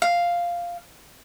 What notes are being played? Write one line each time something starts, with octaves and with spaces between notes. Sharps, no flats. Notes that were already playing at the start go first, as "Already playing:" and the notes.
F5